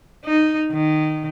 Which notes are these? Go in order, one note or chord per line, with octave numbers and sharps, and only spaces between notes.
D#4
D#3